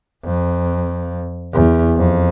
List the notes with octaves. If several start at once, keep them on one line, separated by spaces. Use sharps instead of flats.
F2
E2
F2